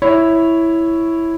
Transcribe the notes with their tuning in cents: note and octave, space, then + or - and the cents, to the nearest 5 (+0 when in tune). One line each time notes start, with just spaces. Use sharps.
E4 +0 C#5 +0